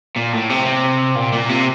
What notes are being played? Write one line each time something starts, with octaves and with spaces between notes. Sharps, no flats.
A#2
A2
C3
C3
A#2
A#2
C3